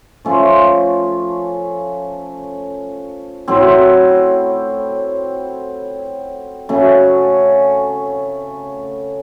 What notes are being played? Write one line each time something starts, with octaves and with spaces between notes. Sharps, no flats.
F3 A3 C#4 F4
A2 F#3 C4
C#3 F#3 A3 C#4